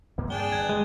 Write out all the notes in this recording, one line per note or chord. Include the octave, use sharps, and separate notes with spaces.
G2 A#3 C4
D4 G#4 G5 G7
G1 F#6 G#6
G#3